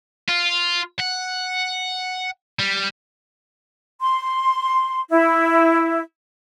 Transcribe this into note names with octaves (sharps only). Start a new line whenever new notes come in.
F4
F#5
G3
C6
E4